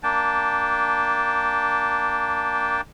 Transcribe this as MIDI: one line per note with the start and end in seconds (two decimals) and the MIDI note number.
0.03 2.81 58
0.03 2.81 62
0.03 2.81 79
0.03 2.81 81